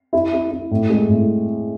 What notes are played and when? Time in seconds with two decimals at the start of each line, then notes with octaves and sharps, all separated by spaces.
0.13 E4
0.33 E4
0.51 E4
0.71 A2
0.90 G#3
1.09 A2